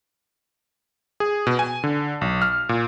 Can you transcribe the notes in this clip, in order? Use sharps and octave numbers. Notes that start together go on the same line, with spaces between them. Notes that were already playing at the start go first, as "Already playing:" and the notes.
G#4
B2
G#5
D3
B1
F6
A#2